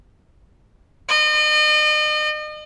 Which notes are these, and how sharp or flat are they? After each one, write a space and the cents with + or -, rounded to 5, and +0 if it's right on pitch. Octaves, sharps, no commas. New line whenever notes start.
D#5 -40